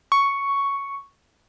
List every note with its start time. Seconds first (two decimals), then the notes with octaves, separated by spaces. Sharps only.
0.12 C#6